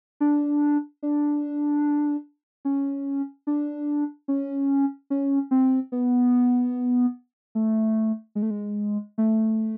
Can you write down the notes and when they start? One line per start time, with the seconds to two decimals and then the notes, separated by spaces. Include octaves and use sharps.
0.21 D4
1.03 D4
2.65 C#4
3.47 D4
4.28 C#4
5.10 C#4
5.51 C4
5.92 B3
7.55 A3
8.35 G#3
8.42 A3
8.50 G#3
9.18 A3